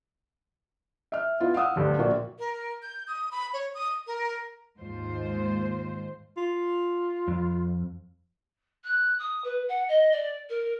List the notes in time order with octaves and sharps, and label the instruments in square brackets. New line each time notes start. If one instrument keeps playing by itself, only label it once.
[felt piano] E5 F6
B3 E4 F4
F5 F#5 D#6 E6
D2 G2 D3
A#1 A#3 F#4 D5
[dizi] A#4
G6
D#6
B5
C#5
D#6
A#4
[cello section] D#2 G#2 F4 C5
[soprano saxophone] F4
[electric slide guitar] F2
[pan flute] F#6
D#6
B4
F#5
D#5
D5
A#4